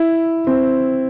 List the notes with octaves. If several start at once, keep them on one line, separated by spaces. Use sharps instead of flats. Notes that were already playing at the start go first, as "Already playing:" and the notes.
Already playing: E4
C4